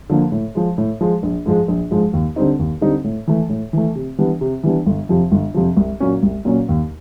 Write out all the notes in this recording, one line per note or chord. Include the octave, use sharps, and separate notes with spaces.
D3 F3 A#3
A2
F3 G#3
A2
F3 G#3
A#1
G#2 F3 G#3
A#1
G#2 F3 G#3
D#2
D3 G3 C4 D#4
D#2
D3 G3 C4 D#4
A2
E3 A3
A2
E3 A3
C3
E3 G3 B3 D4
C3
E3 G3 B3 D4
G1
F2 C3 F3
G1
F2 C3 F3
C2
A#2 F#3 A#3 C#4
C2
A#2 F#3 A#3 C#4
D#2